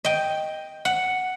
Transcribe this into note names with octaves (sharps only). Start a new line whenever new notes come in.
D#5 G5
F#5